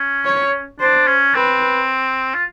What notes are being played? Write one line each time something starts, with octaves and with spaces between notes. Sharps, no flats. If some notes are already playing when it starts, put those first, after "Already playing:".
Already playing: C#4
C#5
D4 C5
C#4
C4 B4
F4